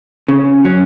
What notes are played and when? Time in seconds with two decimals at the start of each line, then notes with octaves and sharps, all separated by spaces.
0.28 C#3
0.65 F#3 C#4